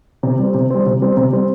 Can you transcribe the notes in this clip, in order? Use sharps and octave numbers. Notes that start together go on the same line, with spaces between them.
C3
G3 C4
C3
G3 C4
C3
G3 C4
C3
G3 C4